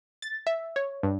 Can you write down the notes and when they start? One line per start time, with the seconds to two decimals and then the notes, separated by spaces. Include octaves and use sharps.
0.22 A6
0.47 E5
0.76 C#5
1.03 G2